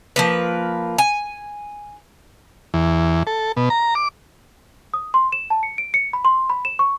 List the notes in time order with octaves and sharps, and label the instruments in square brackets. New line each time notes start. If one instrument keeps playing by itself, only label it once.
[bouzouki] F3 A#3 B4
G#5
[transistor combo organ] E2
A4
B2
A#5
D6
[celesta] D#6
C6
E7
A5
C#7
D7
C#7
B5
C6
B5
E7
C#6